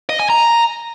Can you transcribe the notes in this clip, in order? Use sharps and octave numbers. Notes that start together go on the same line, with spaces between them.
D#5
G#5
A#5